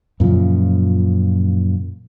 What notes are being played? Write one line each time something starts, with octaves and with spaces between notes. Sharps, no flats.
F#2 A#2 C#3 F3